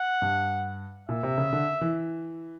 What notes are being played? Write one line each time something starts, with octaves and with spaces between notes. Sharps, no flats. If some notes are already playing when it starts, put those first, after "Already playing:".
Already playing: F#5
G2
A#2 E5
C3
C#3
D3
E3